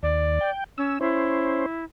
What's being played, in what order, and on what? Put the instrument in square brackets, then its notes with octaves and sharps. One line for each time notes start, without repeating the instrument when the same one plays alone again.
[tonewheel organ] D#2 [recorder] D5
[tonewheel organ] G5
[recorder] C#4 [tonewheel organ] E6
[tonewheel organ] C#4 C5 [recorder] E4